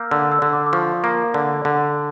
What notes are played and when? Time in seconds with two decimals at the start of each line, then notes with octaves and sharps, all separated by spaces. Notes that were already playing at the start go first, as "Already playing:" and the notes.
Already playing: A#3 D6 E6 F6 G6
0.11 D3 E6
0.32 E6
0.42 D3
0.53 D6
0.66 D6
0.73 F3 C#6
1.04 A#3
1.34 D3
1.65 D3